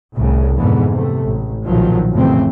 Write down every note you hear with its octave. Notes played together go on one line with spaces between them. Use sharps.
C2 A2 C#3
F2 G#2 B2 D3 E3 B3
C3 A3
A1
B1 G2 A#2 D#3 F3 F#3
F2 A2 C#3 E3 C4